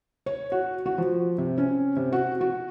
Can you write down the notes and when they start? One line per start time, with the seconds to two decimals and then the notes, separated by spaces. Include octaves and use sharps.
0.26 C#5
0.52 F#4
0.86 F#4
0.98 F3
1.38 C3
1.58 C#4
1.96 C3
2.12 F#4
2.41 F#4